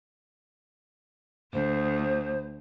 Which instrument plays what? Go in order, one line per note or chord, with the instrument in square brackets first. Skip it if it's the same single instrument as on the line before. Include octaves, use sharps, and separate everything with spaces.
[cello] D2 [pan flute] C5